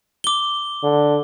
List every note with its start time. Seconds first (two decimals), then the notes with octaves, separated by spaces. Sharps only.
0.24 D6 G7
0.83 D3